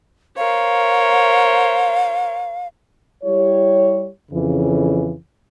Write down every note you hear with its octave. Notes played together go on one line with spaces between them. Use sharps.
A#4 C5 C#5 F5
G3 E4 G4 C#5
F2 C#3 E3